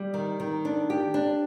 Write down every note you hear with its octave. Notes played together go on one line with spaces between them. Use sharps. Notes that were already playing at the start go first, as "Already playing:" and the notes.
Already playing: G3
D#3
D#3
D4
G4
D4